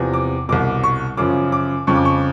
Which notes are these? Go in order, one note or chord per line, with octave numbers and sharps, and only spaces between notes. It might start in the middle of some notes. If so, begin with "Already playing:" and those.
Already playing: E2 C3 F3
D6
C2 B2 D6
C#6
F#2 C#3 F3 D6
D6
F2 C#3 F3 C#6
D6
C#6